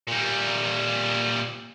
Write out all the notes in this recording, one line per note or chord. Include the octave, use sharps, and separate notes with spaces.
A#2 G3